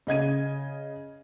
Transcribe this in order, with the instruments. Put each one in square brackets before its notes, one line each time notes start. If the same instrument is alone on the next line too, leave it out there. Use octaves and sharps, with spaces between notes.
[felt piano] C#3 D#5 G#6 D#7